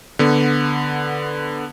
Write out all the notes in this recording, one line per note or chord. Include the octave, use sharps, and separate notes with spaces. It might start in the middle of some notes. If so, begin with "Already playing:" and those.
D3 B3